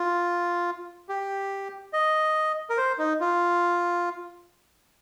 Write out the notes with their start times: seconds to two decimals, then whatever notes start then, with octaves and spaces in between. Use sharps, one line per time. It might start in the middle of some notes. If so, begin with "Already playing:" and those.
Already playing: F4
1.09 G4
1.93 D#5
2.70 A#4
2.78 C5
2.98 D#4
3.20 F4